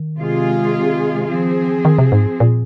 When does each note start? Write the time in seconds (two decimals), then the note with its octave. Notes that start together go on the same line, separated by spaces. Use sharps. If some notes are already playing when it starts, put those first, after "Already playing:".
Already playing: D#3
0.18 C3 G#3 F4 G#4
1.28 F3 C4 G#4
1.85 D#3
1.99 C3
2.12 G#2
2.40 A#2